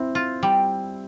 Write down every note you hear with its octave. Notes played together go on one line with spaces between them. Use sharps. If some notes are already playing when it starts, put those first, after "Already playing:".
Already playing: C4 E4
F4
G3